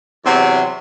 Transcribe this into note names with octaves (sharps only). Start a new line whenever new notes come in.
E2 C3 F#3 C4